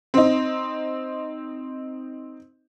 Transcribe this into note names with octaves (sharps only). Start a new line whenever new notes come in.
C4 D#4